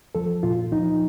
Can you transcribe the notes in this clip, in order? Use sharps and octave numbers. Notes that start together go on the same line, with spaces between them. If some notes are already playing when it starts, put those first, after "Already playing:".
F3 A4
A#2 F4
F3 D#4